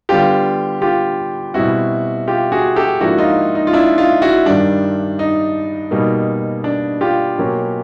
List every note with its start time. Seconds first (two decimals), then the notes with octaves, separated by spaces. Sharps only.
0.09 D3 G3 B3 D4 F4 G4
0.82 F4 G4
1.54 B2 G3 C4 E4 F#4
2.28 F4 G4
2.52 F#4 G#4
2.76 G4 A4
3.00 G#2 F3 A#3 D4 E4 F#4
3.18 D#4 F4
3.55 D#4
3.67 F4
3.73 D4 E4
3.97 D#4 F4
4.22 E4 F#4
4.46 G2 D#3 G3 D4
5.19 D#4
5.91 B2 G3 A#3 D#4
6.64 D4
7.01 F4 G4
7.38 B2 F#3 A#3 C#4